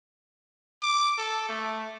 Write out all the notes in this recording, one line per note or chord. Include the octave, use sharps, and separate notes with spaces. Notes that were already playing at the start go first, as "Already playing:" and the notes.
D6
A4
A3